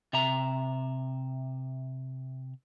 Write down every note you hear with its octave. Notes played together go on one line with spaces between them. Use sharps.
C3 E5 A#5